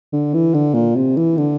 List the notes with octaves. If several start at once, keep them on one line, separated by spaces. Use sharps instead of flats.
D3
E3
D3
A#2
C3
E3
D3